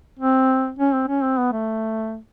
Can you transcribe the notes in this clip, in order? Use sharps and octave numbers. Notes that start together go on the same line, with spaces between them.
C4
C#4
C4
C#4
C4
B3
A3